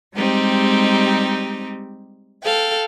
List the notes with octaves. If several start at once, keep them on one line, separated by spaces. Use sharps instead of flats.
G3 G#3 C4 D#4 G4
A4 F5 G5